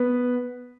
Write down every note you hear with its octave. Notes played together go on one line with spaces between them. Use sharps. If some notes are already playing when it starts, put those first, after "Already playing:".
Already playing: B3 B4